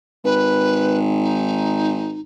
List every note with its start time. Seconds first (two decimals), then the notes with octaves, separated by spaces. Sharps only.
0.24 G#1 B4
1.22 D#4